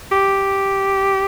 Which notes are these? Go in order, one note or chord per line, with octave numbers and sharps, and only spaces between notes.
G4